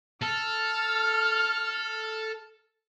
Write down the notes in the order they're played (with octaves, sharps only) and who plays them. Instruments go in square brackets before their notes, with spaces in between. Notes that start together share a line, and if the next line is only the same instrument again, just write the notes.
[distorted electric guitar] A4 [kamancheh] F6